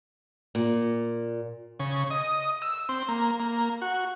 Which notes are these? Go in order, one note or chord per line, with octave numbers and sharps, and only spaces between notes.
A#2
C#3
D#5
E6
C4
A#3
A#3
F#4